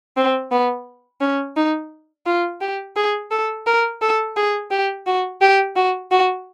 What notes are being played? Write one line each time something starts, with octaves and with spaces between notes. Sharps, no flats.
C4
B3
C#4
D#4
F4
G4
G#4
A4
A#4
A4
G#4
G4
F#4
G4
F#4
F#4